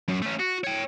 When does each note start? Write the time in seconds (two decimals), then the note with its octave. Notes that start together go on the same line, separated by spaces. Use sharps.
0.08 F#2
0.22 A3 C#4
0.39 F#4
0.64 C#5 G5